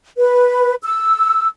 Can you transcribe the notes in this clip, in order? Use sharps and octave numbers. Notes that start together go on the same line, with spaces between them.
B4
E6